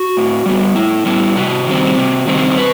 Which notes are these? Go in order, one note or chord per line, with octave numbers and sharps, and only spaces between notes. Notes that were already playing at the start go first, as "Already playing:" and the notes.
Already playing: F#4
A2
G3 B3
A2 E4
G3 B3 E4
C3 F#4
D#3 G3 C4
C3
D#3 G3 C4
B2 B4